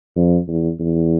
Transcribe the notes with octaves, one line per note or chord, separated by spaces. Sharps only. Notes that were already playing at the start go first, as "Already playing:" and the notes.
F2
E2
E2